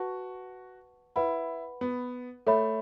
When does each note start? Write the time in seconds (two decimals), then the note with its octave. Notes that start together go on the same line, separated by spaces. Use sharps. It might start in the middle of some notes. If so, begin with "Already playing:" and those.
Already playing: F#4 B4 F#5 A5 C#6
1.16 E4 B4 F#5 B5
1.81 B3
2.47 A3 A4 C#5 E5 B5